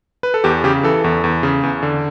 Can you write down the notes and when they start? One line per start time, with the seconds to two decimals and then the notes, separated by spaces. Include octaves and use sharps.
0.23 B4
0.34 A4
0.44 E2 G4
0.64 C#3 G4
0.83 E3 A4
1.04 E2
1.24 E2
1.43 C#3
1.63 E2
1.83 D3